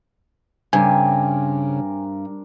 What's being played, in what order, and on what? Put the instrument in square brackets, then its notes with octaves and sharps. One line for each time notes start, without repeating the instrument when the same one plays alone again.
[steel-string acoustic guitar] G2 [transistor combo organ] C#3 [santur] C4 D4 A#4 [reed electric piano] G#5